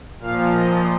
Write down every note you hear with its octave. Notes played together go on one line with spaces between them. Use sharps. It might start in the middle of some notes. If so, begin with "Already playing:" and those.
A#2 F3 F5
A#2 F3 D#5